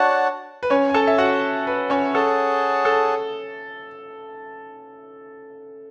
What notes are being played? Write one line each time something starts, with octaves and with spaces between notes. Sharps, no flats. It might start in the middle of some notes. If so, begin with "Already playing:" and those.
Already playing: D4 F#4 C#5 F#5 A5
B4
C#4 C#5
G#5
A4 A5
E5
F#4 F#5
B4
C#4 C#5
G#4 A4 C#5 F#5 A5
A4